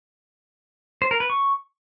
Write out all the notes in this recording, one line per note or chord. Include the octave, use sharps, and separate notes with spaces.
C5
A#4
B4
C#6